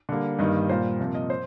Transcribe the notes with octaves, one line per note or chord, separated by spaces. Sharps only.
D3 G3 A#3
G2 D#3 G3 A#3 D#5
A#2 G3 A#3 C5
C3 F3 A#3
D#5
C5